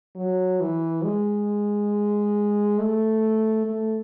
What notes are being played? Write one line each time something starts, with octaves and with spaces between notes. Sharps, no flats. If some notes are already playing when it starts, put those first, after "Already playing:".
F#3
E3
G#3
A3
A3